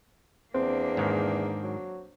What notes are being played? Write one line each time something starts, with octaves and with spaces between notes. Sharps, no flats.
E2 A#3 C4 D4
G#2 D#3
F#3